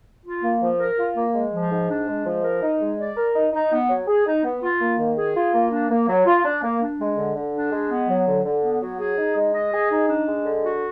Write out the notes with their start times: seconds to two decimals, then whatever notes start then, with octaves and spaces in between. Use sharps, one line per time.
0.25 F4
0.43 A#3
0.61 F3
0.79 A#4
0.98 F4
1.16 A#3
1.34 G#3
1.53 F3
1.70 G#2
1.89 D4
2.07 G#3
2.25 F3
2.43 A#4
2.62 D#4
2.80 G#3
2.98 D5
3.17 A#4
3.35 D#4
3.52 D#4
3.71 B3
3.89 F#3
4.07 G#4
4.26 D#4
4.44 B3
4.62 F4
4.80 A#3
4.98 D#3
5.17 G#4
5.35 F4
5.53 A#3
5.71 D4
5.90 A#3
6.08 F#3
6.26 F4
6.44 D4
6.62 A#3
6.81 D4
7.00 G#3
7.17 D3
7.35 D3
7.54 D4
7.72 G#3
7.90 B3
8.09 F#3
8.26 D3
8.45 D3
8.63 B3
8.81 F#3
8.99 G#4
9.18 D#4
9.36 G#3
9.54 D#5
9.72 G#4
9.91 D#4
10.09 D4
10.27 G#3
10.45 D3
10.63 F#4